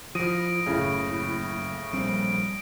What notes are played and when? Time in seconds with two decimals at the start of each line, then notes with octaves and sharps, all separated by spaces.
0.15 F3 E4 D#6 A#6 D7 D#7
0.66 F#1 A2 C#3
1.93 A#1 G3 C4 D7